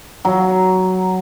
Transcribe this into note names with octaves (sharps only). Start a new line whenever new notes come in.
F#3